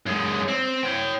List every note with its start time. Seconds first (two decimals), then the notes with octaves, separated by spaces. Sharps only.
0.06 F#2 G#3
0.48 C4
0.83 C#5 G5